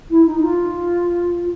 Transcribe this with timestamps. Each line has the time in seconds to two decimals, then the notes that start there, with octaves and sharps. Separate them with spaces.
0.10 E4
0.26 D#4
0.42 F4